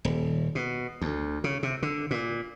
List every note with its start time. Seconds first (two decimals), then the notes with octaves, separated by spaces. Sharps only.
0.05 D#1
0.55 B2
1.01 D2
1.44 C#3
1.63 C3
1.83 D3
2.11 A#2